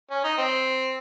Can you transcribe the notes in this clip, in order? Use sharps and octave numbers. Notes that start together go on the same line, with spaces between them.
C#4
D#4
C4